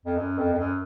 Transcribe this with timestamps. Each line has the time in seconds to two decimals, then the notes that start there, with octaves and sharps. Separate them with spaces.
0.06 F2
0.17 F#2
0.38 F2
0.53 F2
0.58 F#2